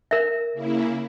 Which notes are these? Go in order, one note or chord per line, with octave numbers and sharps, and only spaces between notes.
A#4 E5
C#3 A#3 E4